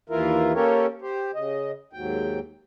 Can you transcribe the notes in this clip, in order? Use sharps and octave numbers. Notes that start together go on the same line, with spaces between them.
D#2 E3 E4 F4 A#4
A#3 C#4 G4 A4 A#4 C#5
G4 C5
C#3 D#5
D#2 G#2 F#3 G5